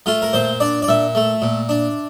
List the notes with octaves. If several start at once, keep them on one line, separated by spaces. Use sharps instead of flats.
A3 F4
A#4
A#2 C5
D4 D5
D5
A#2 E5
A3
A#2
D4